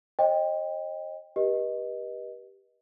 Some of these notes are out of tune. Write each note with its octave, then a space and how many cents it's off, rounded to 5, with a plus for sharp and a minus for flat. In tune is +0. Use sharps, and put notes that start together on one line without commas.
C5 +45 D#5 +0 G5 +15
G4 +0 B4 -35 D#5 +0